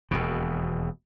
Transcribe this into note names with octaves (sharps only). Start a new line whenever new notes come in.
E1 D#2 B2